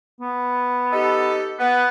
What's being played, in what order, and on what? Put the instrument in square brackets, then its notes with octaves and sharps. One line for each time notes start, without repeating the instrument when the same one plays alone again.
[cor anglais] B3
[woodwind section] D#4 G4 A4
B3